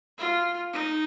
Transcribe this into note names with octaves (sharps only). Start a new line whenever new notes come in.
F4
D#4